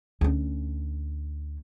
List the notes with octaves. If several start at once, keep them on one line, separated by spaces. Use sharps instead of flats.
D2 C#4